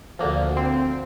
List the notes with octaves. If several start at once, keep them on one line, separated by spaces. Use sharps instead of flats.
D2 D3 F3 A#3
C4